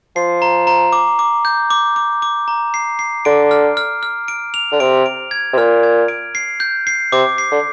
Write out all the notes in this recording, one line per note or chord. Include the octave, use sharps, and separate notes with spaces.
F3 C7
A#5
A#5
D6
D6
G6
D6
D6
D6
A#5
C7
C7
D3 D7
F6
F6
F6
D7
F7
D3
C3 D7
D7
G#6
C3
A#2 F6
G#6
D7
C7
G6
C7
C3 D6
C7
D3